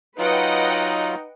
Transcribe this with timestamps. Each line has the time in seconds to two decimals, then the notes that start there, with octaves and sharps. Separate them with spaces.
0.19 F#3 D#4 F4 B4 D#5 F#5 G5